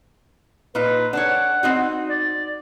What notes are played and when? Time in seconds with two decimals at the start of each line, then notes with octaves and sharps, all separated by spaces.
0.75 A#2 D#4 F4 B4
1.13 D4 A4 C#5 F#5
1.63 C4 D#4 F#4
2.09 D5